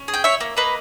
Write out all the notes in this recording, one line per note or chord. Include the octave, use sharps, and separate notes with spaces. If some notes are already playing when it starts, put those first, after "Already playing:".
Already playing: C#4
G#4
G5
E4 C#5 E5
A#3
A#3 B4 D#5